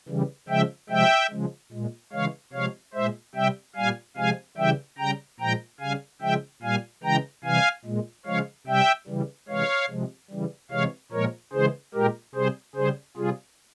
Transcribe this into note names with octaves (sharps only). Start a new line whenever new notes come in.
C#3 E3 G3
C#3 F3 G#3 E5 G5
C3 F3 G#3 E5 G5
C#3 F3 G#3
A#2 G#3
C#3 E3 G#3 C#5 F5
C3 F3 G#3 C#5 F5
A#2 G#3 C5 E5
C3 G3 E5 G5
A#2 G3 F5 G#5
C3 F3 G#3 F5 G#5
C#3 E3 G3 E5 G5
C#3 G3 G5 A#5
A#2 F3 G#3 G5 A#5
C#3 G3 F5 G#5
C#3 F3 G#3 E5 G5
A#2 G3 F5 G#5
C#3 E3 G#3 G5 A#5
C3 E3 G3 F5 G#5
A#2 G#3
C#3 F3 G#3 C#5 F5
C3 G3 E5 G5
C#3 E3 G3
C3 E3 G#3 C#5 F5
C3 F3 G#3
C#3 E3 G3
C3 E3 G#3 C#5 F5
A#2 F3 G#3 A#4 C#5
C#3 E3 G#3 G#4 C5
A#2 G#3 G4 A#4
C3 G3 G#4 C5
C#3 G3 G#4 C5
C3 G3 F4 G#4